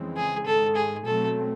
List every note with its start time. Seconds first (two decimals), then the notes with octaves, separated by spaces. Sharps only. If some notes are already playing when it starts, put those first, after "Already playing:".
Already playing: F2 C#3 E3 G#3 C4
0.16 G#4
0.46 G#2 D#3 G#3 A4
0.76 G#4
1.05 B2 F#3 A3 C4 A4